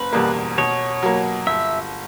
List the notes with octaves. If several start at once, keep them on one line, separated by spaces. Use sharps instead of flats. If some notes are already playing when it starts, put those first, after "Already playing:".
Already playing: F#1 B4
E2 B2 G3 A#3
B2 C#5
F#3 A#3
G1 E5